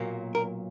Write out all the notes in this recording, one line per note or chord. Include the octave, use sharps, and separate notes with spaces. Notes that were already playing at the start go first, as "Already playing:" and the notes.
Already playing: B1 A#2 F#3 A#3
A#4